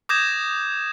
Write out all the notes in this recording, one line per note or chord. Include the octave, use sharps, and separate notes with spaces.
D6 D#6 G6 G#6 A#6 E7